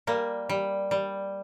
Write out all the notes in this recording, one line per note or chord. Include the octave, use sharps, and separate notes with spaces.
G3 A#3
G3
G3